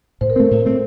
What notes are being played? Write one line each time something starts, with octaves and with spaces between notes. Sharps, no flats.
A2 C5
A#4
A3 C4 C5
A2
A3 C4